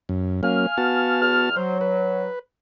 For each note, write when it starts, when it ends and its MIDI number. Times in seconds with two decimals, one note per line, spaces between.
0.09 0.41 42
0.43 0.67 54
0.43 0.67 58
0.43 0.67 61
0.43 1.19 77
0.43 1.19 80
0.43 1.19 89
0.78 1.50 59
0.78 1.50 66
0.78 1.50 81
1.21 1.53 40
1.21 1.53 89
1.56 2.26 54
1.56 1.78 72
1.81 2.39 71